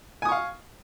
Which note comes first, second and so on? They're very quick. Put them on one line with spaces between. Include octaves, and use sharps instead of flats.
G#5 D#6 C#6 F5